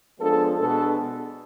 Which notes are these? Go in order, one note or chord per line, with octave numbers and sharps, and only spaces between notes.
F3 G#3 B3 D4 A4
B2 G#3 B3 D4 A4